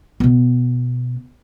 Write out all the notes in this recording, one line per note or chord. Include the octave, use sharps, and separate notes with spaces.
B2 B3